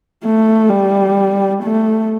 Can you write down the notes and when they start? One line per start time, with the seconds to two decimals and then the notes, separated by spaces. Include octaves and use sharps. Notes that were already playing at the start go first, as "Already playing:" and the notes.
0.24 A3
0.70 G3
1.63 A3